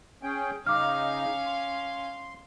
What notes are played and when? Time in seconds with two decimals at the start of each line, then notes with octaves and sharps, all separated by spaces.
0.23 C#4 G#4 G5
0.66 C#3 C#4 D#4 F5 D6 F6
1.46 C6